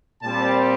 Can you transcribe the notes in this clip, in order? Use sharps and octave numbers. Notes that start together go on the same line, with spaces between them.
A#2 G3 C4 A5